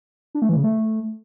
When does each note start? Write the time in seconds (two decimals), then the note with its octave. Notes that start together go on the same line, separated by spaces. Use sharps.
0.35 D4
0.42 A3
0.49 E3
0.56 C#3
0.64 A3